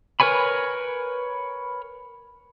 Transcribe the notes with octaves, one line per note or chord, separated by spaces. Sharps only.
A#4 B4 C#5 G#5 B5